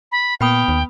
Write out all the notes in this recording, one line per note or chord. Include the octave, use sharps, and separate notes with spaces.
B5
A#2 B3 G5 B5 D#6
D#2